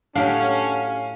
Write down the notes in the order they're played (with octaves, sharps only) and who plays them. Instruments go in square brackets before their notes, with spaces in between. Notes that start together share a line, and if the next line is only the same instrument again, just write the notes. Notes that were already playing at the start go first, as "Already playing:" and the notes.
[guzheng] A2 F#3 [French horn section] C#4 [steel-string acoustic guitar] D4 G4 A5 [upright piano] F5